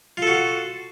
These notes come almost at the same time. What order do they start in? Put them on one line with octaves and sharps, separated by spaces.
F4 A4 F#4